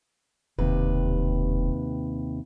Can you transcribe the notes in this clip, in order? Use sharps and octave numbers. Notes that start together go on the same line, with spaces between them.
E1 D#2 C3 B4